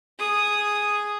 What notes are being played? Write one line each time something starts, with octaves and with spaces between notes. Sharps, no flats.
G#4 D#6